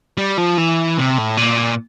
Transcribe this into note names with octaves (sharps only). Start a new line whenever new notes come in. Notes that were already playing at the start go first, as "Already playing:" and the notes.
G3
F3
E3
C3
A2
A#2